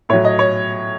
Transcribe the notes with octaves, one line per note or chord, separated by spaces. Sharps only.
A2 F#3 C#5
D#5
C#5